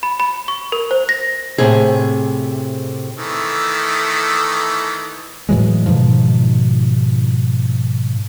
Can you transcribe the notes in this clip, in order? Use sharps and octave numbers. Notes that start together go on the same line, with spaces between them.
B5
B5
C#6
A#4
C5
A#6
A2 C3 C4 G#4
D#3 E3 A3
A2 E3 F#3 G#3
G#2 B2 D#3 F3